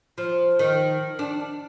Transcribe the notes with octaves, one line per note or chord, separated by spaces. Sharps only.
F3
D#3
D4